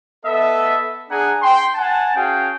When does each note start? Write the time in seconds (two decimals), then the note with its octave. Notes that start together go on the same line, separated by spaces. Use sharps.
0.24 B3 A4 D#5 E5
1.10 D4 G#4 F#5 G#5 A#5
1.42 G5 C6
1.75 F#5 G#5 A5
2.15 C#4 F#4 G#4 F5 G5